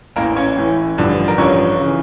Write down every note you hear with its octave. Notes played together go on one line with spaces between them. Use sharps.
A1 A2 E3 A#3 A#4
C#4 C#5
A1 A2 E3
A1 G2 D3 F3
A#4
A1 G2 D3 F3 C#4 C#5
C#3 E3